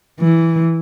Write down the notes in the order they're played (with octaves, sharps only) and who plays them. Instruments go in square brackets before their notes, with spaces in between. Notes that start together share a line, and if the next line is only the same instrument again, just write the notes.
[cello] E3